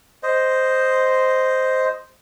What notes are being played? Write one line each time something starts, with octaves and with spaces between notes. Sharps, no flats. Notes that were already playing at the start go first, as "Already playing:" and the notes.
C5 D#5